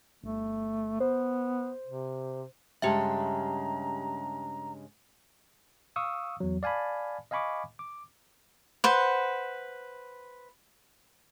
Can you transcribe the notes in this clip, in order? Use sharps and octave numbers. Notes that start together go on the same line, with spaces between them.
G1 A3
B3 C5
C3
G2 C#3 G#3 G4 E5 G5 A5 A#5
F5 C#6 D#6 E6
E2 F#3
D5 F5 G#5 A5 B5
D#5 F5 G#5 B5 C#6 D6
D6
B4 C5 F#5